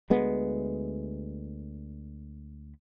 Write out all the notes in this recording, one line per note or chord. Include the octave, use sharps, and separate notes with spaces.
D2 G#3 B3